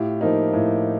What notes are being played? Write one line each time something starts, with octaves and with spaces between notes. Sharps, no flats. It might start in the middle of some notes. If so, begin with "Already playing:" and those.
Already playing: A2 F4 G4
F3 A#3 D#4
A2